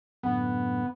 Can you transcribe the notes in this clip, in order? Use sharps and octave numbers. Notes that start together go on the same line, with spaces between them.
F#2 A2 D3 B3